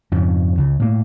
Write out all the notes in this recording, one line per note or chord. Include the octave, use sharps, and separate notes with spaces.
F2 G#2 C#3
C#2 C#3
A2 A#3